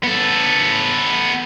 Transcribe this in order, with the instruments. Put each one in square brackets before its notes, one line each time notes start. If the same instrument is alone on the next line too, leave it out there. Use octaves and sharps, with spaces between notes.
[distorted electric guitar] B3 A4